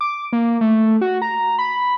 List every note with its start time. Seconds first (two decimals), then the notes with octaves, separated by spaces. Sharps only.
0.01 D6
0.33 A#3
0.61 A3
1.01 F#4
1.22 A#5
1.59 B5